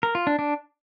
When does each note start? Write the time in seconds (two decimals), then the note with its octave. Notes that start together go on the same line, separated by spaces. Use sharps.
0.03 A#4
0.15 F4
0.27 D4
0.39 D4